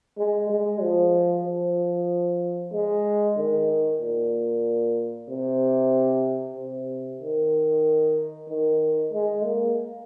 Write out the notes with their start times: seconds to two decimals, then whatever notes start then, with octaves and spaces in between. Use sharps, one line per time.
0.18 G#3
0.50 G#3
0.82 F3
1.46 F3
2.73 G#3
3.37 D#3
4.01 A#2
5.30 C3
6.57 C3
7.21 D#3
8.49 D#3
9.13 G#3
9.45 A#3